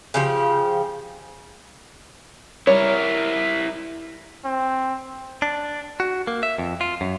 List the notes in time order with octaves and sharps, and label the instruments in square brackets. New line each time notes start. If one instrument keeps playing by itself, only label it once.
[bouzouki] C#3 F3 G4
[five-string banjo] G3 C#5 [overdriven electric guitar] E4 A#4
[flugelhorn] C4
[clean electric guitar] D4
F#4
A#3
E5
F2
F4
F#2